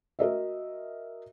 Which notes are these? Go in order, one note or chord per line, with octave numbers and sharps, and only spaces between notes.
F#4 A#4 D#5 E5